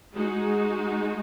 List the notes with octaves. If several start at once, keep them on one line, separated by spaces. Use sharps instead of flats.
G#3 D#4 F#4